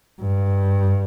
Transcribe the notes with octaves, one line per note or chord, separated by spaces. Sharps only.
G2